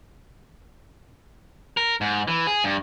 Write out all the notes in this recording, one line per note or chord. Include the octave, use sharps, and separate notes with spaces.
A#4
G#2
E3
G#4
G2